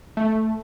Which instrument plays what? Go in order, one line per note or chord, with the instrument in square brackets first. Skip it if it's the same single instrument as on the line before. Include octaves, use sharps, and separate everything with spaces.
[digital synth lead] A3